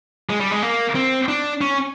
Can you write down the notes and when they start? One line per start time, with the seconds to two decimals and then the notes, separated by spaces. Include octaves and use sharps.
0.30 G#3
0.41 G3
0.51 G#3
0.63 A#3
0.95 C4
1.29 D4
1.61 C#4